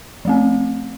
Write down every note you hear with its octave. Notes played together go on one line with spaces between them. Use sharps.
F3 A3 C4